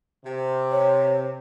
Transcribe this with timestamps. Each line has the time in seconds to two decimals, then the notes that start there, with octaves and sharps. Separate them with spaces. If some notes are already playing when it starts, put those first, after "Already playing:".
0.25 C3
0.71 C#5